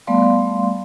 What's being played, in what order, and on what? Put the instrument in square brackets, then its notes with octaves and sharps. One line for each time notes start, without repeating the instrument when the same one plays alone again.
[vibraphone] G3 A3 B3 D5 F5 C6